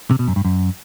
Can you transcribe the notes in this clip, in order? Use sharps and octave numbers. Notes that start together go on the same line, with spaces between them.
C3
B2
F#2
G2
F#2